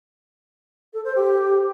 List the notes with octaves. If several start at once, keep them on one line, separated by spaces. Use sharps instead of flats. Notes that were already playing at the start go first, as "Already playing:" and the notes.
A4
C5
G4